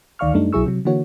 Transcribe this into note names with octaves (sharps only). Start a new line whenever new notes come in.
D2 D#3 D5 F5 C#6 F6
F#2 G3 A3 D4 D#4
B1 F#3 E4 G#4 C#6 E6
C3 F#3
D3 E3 A#3 F#4 C#5